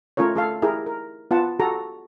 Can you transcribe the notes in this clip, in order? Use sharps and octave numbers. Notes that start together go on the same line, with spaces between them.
A3 C#4 F4 A#4 C#5
A3 A4 F5
E4 G4 G#4 A#4
A#4
B3 F4 F#5 A5
F#4 G4 A4 A#5